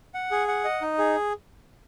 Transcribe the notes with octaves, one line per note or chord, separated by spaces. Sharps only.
F#5
G#4
F#5
D#5
D#4
G#4